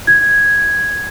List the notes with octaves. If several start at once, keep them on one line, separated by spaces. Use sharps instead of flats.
G#6